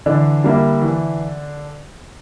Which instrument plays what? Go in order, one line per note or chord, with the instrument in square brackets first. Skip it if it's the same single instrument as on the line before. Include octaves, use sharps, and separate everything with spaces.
[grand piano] D3 D4 [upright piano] E3
[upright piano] G3 A#3 E4
E3